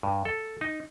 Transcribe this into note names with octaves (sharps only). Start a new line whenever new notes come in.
G2
A4
D#4